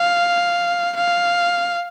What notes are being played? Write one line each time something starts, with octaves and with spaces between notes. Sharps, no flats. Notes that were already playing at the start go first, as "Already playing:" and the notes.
Already playing: F5
F5